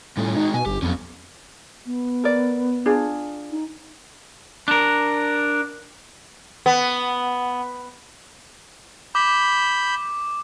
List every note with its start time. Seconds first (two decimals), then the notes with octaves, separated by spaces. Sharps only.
0.17 A2 G3 C#4 F4
0.37 G#3 D#4 F#4
0.54 B2 G#5
0.66 G1 G4
0.82 F2 F#3 B3 C#4
1.86 B3
2.24 A#4 D5
2.86 D4 F4 G#4
3.51 D#4
4.68 D4 A#4
6.66 B3
9.15 B5 D6 G6